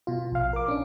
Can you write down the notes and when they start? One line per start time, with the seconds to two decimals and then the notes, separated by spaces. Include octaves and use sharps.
0.07 B2 F4
0.32 A#1 F5
0.53 A#4 D6
0.68 C#4 D4